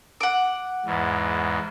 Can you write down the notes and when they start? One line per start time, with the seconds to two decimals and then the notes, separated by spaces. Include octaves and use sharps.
0.21 F#5 D6
0.86 E2 G#2